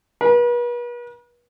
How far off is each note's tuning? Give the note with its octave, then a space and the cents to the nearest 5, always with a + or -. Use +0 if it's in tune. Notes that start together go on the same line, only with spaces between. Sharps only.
B4 -40